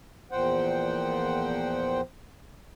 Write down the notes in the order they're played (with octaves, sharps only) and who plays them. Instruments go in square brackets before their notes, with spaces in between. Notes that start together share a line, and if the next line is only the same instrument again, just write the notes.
[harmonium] E2 A#2 F3 C5 F#5 G5